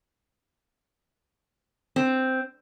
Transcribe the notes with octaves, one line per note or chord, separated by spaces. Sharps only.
C4